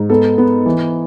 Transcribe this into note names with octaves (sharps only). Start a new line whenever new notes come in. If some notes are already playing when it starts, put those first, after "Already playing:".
Already playing: G#2
B3 A4
B3
E3